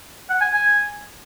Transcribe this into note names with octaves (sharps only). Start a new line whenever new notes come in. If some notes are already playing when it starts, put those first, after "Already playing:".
F#5
G#5
G#5